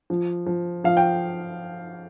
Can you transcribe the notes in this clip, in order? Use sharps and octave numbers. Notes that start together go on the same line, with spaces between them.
F3
F3
F3 F5
G5